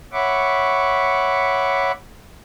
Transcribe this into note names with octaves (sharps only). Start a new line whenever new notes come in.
C#5 E5 F#5 B5 C#6 D6